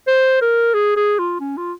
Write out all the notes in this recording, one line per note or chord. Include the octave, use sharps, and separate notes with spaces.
C5
A#4
G#4
G#4
F4
C#4
F4